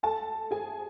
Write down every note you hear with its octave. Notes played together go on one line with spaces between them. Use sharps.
A4 A5
G#4 G#5